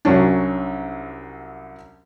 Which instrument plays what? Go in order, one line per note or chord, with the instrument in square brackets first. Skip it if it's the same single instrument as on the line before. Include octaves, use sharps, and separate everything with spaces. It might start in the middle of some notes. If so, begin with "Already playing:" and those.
[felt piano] C2 F#3 C#4 D4